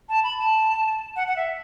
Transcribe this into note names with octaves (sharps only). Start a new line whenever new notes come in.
A5
B5
A5
F#5
F#5
E5